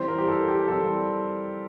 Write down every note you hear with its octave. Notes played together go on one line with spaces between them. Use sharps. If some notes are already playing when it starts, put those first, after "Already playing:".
Already playing: E3 G3 C4 C5
A#4
G4
A4
G4
E3 G3 C4 A4